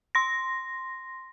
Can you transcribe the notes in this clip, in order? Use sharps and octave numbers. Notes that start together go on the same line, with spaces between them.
C6 A#6